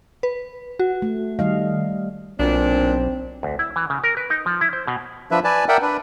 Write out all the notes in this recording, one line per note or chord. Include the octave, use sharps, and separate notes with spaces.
B4
F#4
A3
D#3 G3 D#5 F5
B1 A#2 C4 D4
D2
E4
E3
C#3
A#4
B4
D#4
F3
E4
C5
B2
F3 D4 B4 E5
B4 D5 G#5 A5
A#4 D5 E5 F#5 G5
D4 B4